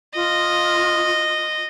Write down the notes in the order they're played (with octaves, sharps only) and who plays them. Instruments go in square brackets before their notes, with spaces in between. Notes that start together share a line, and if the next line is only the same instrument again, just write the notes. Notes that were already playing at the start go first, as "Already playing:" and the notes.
[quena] F4 [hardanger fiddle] D#5